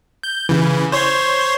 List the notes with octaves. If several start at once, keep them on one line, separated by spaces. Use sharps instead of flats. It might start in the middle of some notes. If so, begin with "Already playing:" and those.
G6
C#3 E3
C5 C#5 C6